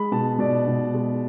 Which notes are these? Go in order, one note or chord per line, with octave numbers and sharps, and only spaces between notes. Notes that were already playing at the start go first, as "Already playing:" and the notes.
Already playing: G#3 B5
B2 A5
B2 D5
B2
G#3